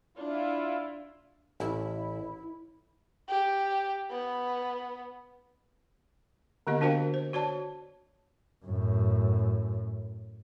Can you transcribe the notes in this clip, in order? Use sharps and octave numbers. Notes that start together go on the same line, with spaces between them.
D4 E4 F4
A1 E4
G4
B3
D3 A#3 B3 G4 D#5
D4 F#4 A#4 C5 F5 G5
C5
F#4 C#5 D5 A5
F#2 A2